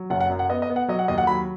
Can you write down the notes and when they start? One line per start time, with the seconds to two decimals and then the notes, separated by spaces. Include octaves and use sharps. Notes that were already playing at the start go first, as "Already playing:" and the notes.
Already playing: F#3
0.10 F#1 F#5
0.20 F#5
0.29 F#2
0.39 F#5
0.49 B3 D#5
0.62 D#5
0.70 B3
0.76 F#5
0.88 F#3 D#5
0.99 F#5
1.08 D#2 D#5
1.18 F#5
1.27 F#3 B5